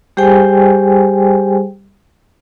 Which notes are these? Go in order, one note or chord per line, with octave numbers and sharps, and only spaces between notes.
G3 G4 G#4 C5 G5 G#5